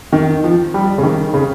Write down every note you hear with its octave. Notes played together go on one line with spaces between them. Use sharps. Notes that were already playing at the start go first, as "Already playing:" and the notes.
D#3
F3
G3
C#3
D#3
C#3